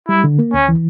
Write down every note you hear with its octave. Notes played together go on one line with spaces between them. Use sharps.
G3 E4
D3
A#3
D2 C#4
E3